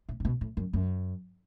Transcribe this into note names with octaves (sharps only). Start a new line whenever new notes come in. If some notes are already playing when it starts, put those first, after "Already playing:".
A2
A2
B2
A2
F#2
F#2